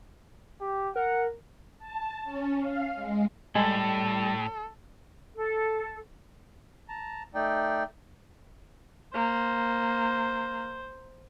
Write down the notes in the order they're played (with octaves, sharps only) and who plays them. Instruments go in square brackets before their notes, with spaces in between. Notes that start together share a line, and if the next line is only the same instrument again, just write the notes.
[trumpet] G4
[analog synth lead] A#4 [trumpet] F#5
[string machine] A5
C#4
F5
G#3
[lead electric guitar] A2 [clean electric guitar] G3 [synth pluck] G#3 [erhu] A4
[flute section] A4
[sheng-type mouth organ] A5 A#5
A3 D#4 D5 G5
[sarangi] A#3 [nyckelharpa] C5